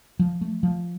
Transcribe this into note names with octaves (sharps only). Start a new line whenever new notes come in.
F3
A3
F3